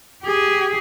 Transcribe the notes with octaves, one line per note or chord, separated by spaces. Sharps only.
G4 G#4